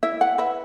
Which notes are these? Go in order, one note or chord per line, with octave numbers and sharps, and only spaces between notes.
E4 E5
F#5
B4 E5